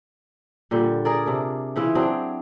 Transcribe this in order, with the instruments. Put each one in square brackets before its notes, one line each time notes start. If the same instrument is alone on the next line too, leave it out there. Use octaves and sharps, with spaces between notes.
[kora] A#2 D3 G3
G#4 A#4 D5
C3 D4
C#3 E3 E4 F4
F#3 C4 D4 G#4